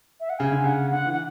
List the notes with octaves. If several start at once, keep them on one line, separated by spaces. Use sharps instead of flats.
E5
F#5
C#3 G#5
D3
C#3 F#5
D3 F#5
E3
F#5